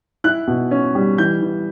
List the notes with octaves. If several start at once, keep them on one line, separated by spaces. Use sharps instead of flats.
E4 F#6
B2
C#4
G3
E3 G6
E3